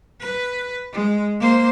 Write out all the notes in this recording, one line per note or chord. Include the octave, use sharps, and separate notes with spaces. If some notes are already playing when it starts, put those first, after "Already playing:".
B4
G#3
A#3 C5